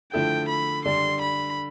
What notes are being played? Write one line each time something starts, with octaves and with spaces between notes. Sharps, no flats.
D3 F3 A3 E4 A4 G5
B5
D3 G3 D4 C6
B5